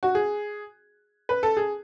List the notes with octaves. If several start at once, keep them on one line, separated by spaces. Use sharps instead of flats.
F#4
G#4
B4
A4
G#4